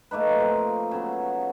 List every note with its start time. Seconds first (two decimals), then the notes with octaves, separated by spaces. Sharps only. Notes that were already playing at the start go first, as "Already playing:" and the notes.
0.11 A3 A#3 D#4 B4
0.39 F3 C4
0.91 C#3 F#3 B3